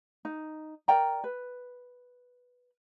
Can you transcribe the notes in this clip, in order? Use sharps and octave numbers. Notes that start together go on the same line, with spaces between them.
D#4
A#4 D5 G5 A#5
B4